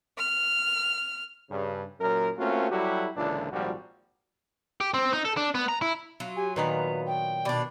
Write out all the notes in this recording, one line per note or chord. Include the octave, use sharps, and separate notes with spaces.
F6
G2 C#3
F#2 A#2 A#4
A3 A#3 C4 C#4 F4 F#4
F#3 G3 E4 F#4 G4 A4
C#2 A#2 D3 E3 D4
G#1 A#2 F3 G3 F#4
G4
C4
D#4
A4
D4
B3
A#5
E4
F#3 F4
G4 G#5
A#2 D#3 B3 B4 A#5
G5
B2 D4 D5